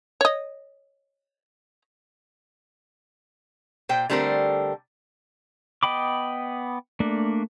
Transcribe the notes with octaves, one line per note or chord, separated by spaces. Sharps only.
C#5 D#5
A#2 C5 G5
D3 G3 A3 C4 E4 A#4
B3 D#5 G5 B5 D6
A3 A#3 D4